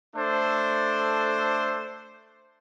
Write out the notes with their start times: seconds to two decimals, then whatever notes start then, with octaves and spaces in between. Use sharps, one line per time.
0.16 A3 D4 A4 C5